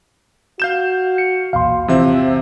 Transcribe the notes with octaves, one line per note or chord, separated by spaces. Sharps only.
F#4 F5 G6 E7
C#7
B1 E2 A#2 F5 C6
A1 C3 E3 F3 C4 E5